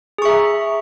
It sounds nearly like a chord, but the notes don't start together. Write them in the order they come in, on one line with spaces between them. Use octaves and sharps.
G#4 C#6 E5 A#5